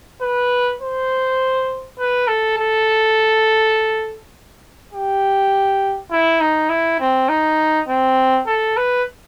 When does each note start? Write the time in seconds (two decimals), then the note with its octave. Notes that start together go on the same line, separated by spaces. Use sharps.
0.22 B4
0.81 C5
1.99 B4
2.28 A4
2.58 A4
4.93 G4
6.11 E4
6.41 D#4
6.69 E4
7.00 C4
7.29 D#4
7.88 C4
8.47 A4
8.77 B4